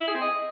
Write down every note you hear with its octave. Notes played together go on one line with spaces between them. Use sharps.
E4
G#4
C4
D#5